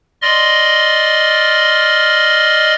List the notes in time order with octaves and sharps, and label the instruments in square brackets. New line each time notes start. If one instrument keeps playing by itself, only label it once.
[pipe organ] D5 D#5 C6 F6